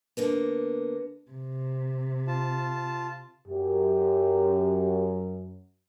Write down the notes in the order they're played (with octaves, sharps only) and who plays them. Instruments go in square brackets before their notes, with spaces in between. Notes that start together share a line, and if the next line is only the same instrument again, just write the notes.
[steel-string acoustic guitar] D3 A#3 B3
[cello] C3
[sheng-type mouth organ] F4 A5
[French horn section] F#2 [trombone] G4